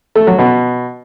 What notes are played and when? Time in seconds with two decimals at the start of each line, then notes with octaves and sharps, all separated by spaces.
0.15 A3
0.27 F#3
0.39 B2